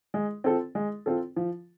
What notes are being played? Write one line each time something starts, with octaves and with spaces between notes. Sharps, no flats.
G#3
C4 F4 A4
G#3
C4 F4 A4
F3